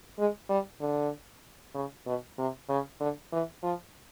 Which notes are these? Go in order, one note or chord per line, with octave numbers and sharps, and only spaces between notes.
G#3
G3
D3
C#3
B2
C3
C#3
D3
E3
F3